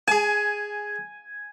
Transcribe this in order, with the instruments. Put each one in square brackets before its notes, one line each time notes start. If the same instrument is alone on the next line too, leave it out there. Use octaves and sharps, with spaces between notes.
[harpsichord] G#4 A5 [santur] G#5